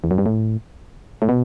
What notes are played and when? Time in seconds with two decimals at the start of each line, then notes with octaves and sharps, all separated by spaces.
0.04 E2
0.11 F#2
0.18 G2
0.26 A2
1.22 A2
1.29 B2